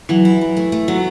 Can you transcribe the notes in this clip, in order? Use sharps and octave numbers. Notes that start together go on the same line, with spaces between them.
E3 F#3
E4
E4
A3
A3
F#3 B3